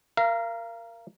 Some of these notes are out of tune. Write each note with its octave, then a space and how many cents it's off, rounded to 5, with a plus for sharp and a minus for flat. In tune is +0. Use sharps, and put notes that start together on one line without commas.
A#4 +0 F5 -30